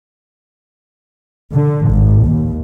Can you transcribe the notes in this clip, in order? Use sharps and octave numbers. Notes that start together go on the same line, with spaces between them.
D3
G#1
D#2